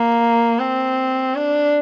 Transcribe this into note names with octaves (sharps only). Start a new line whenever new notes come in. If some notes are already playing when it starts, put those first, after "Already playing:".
Already playing: A#3
C4
D4